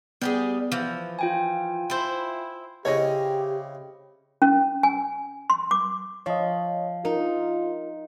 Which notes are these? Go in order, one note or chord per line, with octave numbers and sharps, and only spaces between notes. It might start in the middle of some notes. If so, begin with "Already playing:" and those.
G3 B3 G4 G#4
E3 F3
F4 G5 G#5
E4 C5
C#3 C4 E4 G4 C#5 D#5
C#4
G#5
C6
D6
F3 C#5 D#5
D#4 F4 A#4